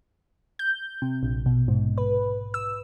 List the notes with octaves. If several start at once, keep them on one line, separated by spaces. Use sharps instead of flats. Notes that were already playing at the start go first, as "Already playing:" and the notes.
G6
C3
A#1
B2
G#2
B4
E6